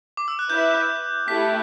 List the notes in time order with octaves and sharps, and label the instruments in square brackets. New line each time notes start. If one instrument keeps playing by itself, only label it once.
[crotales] D6
E6
F#6
[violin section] E4 B4 E5 [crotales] G6
[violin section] A3 E4 G4 [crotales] B6